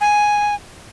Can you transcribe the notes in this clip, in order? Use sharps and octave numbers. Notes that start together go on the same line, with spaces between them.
G#5